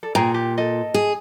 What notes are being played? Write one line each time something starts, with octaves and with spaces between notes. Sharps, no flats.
A4 D5
A#2 G#4 G5 A#5
G4
A4 D#5
G#4